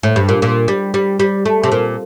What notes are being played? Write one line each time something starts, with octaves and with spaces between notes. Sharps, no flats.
A2
G2
A#2
A#2
G3
G3
G3
A3
C3
A#2